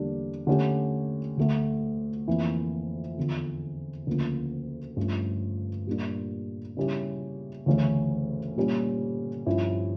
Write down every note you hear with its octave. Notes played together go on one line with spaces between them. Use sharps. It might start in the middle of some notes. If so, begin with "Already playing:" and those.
Already playing: E2 D3 G3 A#3 D4
D3 A3 C#4 G4
D2 D3 A3
F2 E3 A#3 E4
E2 D3 F3
D2 C#3 F3 A#3
G2 F3 A3 C#4 F4
A#2 G3 A#3 D4
C#3 G3 C#4 E4 G4
D2 C#3 E3 A3 C#4
A#2 G3 C#4
G2 F3 C#4 E4